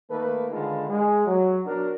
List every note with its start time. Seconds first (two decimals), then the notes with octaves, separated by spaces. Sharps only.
0.10 D#3 A3 A#3 A4 B4
0.52 D3 D#3 G#3 F4 A4 B4
0.90 G#3
1.27 F#3
1.66 B1 F#3 D4 F#4 A#4